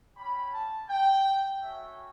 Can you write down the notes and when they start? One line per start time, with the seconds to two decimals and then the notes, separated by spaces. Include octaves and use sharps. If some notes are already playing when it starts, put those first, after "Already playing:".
0.16 C#4 G4 B5
0.54 A5
0.90 G5
1.61 A3 C#4 F#4 E5